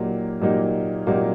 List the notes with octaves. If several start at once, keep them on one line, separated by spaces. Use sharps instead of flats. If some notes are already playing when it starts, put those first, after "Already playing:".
Already playing: A#2 F#3 A#3 D#4 G4
A#2 F#3 A#3 D#4 G4
A#2 F#3 A#3 D#4 G4